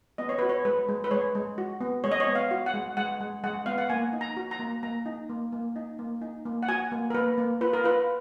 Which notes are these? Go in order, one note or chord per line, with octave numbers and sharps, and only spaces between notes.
B3 D#5
C#5
F#4 B4
C#5
G#3 B4
G#3
B4
G#3 C#5
G#3
F#4
B3
G#3 C#5
D#5
C#5
B3
F5
F#4
F#5
G#3
G#3 F#5
G#3
G#3 F#5
B3 F5
F#5
A#3 G#5
D#4
A#5
F#4
A#5
A#3
A#3 A#5
D#4
A#3
A#3
D#4
A#3
D#4
A#3
F#5
F#4 G#5
A#3
A#4
A#3 B4
A#3
F4 B4
A#4
F4 B4